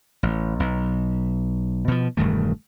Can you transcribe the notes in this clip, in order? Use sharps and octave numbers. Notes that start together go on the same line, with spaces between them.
A1
B1
B2 F3
E1 G2 D#3 A3